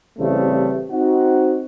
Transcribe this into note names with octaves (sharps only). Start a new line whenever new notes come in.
A1 C#3 E3 G3 A3 C4
C4 D#4 F#4